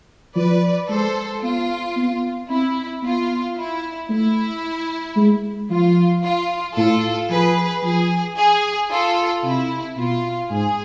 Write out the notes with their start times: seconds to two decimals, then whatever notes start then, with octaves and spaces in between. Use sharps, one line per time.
0.36 F3 B4 D5
0.89 G#3 A4 C5
1.43 B3 F4
1.96 B3
2.50 C4 E4
3.03 B3 F4
3.57 E4
4.10 A3 E4
5.17 G#3
5.70 F3 F4
6.23 F4
6.77 A2 F4 A4
7.30 F3 G#4 B4
7.83 F3 G#4
8.38 G#4
8.91 F4 A4
9.44 C3 E4
9.97 B2 F4
10.51 G#2 G#4